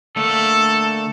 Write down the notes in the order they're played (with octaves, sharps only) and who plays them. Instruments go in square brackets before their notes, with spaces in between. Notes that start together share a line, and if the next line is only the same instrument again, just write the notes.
[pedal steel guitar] D3 A3 A#3 [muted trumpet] A4